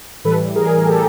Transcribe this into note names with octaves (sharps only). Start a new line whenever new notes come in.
A2 E3 G3 A4 B4
G#4 A#4
G4 A4